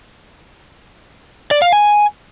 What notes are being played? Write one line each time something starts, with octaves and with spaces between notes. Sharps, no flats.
D5
F5
G#5